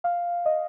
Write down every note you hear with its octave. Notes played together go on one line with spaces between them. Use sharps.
F5
D#5